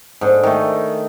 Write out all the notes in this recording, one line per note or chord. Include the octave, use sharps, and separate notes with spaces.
G#2 D3
D#3 A3